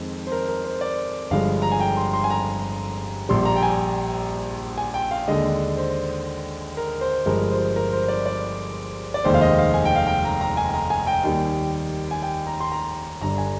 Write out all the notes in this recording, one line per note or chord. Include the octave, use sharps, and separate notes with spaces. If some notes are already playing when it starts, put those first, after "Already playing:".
Already playing: F2 D#3 G#3 C5
C5
A#4
A#4
C5
D5
G1 G2 D3 F3 G#3 F5
A#5
G#5
G5
C6
C6
G#5
A#5
A#1 A#2 G3 C6
A#5
G5
G#5
G#5
G5
F5
D#2 D3 G#3 D#5
C5
A#4
C5
G1 G2 F3 G#3 A#4
C5
A#4
C5
D5
D5
D5
F1 D#2 D#3 G#3 C5
F5
D#5
F5
G#5
G5
F5
G5
A#5
A#5
G#5
A#5
G#5
G5
D#2 D#3 G3
G#5
G5
A#5
C6
A#5
G1 G2 D3 A#5
G#5